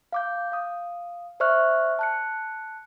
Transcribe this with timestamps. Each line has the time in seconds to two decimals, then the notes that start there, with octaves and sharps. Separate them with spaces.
0.12 F5 D6 G6
0.52 F5 D#6
1.40 C5 D5 E5 C#6 F6 F#6
1.99 A5 F#6 C#7